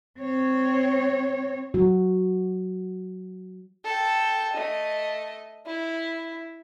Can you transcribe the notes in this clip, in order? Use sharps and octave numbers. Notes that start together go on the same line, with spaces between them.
C4 C#5
F#3 F#4
A4 G5
A3 D#5
E4